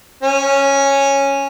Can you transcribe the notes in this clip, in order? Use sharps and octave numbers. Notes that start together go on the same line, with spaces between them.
C#4